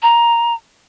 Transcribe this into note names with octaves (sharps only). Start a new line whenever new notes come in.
A#5